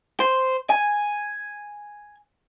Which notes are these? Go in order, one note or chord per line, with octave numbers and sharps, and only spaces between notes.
C5
G#5